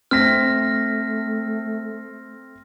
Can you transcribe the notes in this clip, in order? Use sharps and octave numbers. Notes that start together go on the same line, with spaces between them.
A3 C4 F6 A#6 B6